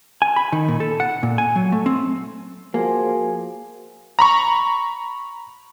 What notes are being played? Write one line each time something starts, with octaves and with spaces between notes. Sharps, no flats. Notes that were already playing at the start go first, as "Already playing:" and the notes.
G#5
B5
D#3
A#2
A4
F#5
A#2
G#5
F#3
A3
C4
F3 A#3 F#4 G#4 G#5
A#5 B5 C#6